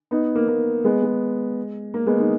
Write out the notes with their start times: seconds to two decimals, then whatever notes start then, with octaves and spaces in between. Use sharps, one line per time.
0.11 B3 D#4
0.35 A#3
0.48 A#3
0.84 G#3 B3
1.02 G#3
1.94 A#3
2.06 G#3 B3
2.18 B3 D#4